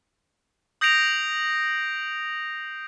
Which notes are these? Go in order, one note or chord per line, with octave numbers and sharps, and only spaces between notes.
D#6 G6 A#6 C7 D7 F7